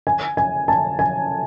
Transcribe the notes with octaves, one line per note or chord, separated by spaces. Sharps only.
G#5
G#5
A5
G#5